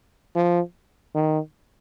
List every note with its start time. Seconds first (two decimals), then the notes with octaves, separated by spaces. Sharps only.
0.36 F3
1.15 D#3